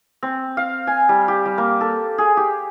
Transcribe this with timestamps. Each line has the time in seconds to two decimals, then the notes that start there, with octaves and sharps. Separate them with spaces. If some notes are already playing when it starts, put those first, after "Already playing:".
0.23 C4
0.57 F5
0.87 G#5
1.09 G3
1.28 G4
1.46 G3
1.58 A#3
1.81 A4
2.18 G#4
2.37 G4